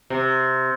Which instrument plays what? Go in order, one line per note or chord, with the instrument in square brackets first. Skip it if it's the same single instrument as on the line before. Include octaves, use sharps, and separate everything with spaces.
[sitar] C3